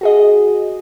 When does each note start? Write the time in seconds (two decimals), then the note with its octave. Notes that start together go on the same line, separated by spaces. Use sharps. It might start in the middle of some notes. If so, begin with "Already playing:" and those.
0.01 F#4 G#4 D#5